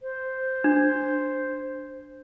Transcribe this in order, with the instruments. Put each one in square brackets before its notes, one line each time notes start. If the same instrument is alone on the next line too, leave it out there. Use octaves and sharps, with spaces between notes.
[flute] C5
[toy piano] D4